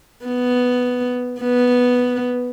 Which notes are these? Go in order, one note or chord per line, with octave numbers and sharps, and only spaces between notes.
B3
B3